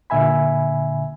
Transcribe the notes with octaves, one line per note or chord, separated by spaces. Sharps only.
A#2 D3 E5 G#5 B5